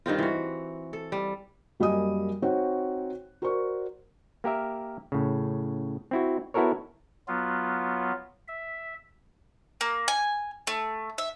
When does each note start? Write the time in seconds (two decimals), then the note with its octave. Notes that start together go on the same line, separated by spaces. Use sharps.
0.06 G2 D#3 C4 F4
0.18 E3 F#4
0.93 A4
1.12 G3
1.80 F#2 G3 A#3 D#5 G#5 D#6
2.42 C4 D#4 F#4 C5 C#5 F#5
3.42 F#4 A#4 C5 D5 C#6
4.44 A#3 G4 A#4 E5
5.12 A2 C#3
6.11 C4 E4 F#4
6.54 B3 E4 F#4 A4 A#4 C#5
7.28 F#3 B3 F4
8.48 E5
9.81 A#3
10.08 G#5
10.67 A3
11.18 E5